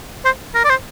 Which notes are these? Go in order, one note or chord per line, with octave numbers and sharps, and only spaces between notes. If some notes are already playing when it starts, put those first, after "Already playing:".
C5
A#4
D5
C5